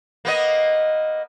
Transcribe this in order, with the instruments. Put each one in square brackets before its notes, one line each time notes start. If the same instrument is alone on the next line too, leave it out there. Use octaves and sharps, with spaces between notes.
[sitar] A#3 B3 D#5